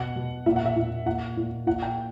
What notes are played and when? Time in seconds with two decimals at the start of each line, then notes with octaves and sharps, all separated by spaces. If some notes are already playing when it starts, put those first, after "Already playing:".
Already playing: B2 F#5
0.16 B2
0.46 A#2 E5
0.56 F#5
0.66 E5
0.76 A#2
1.06 A#2 F#5
1.37 A#2
1.67 A#2 F#5
1.82 G5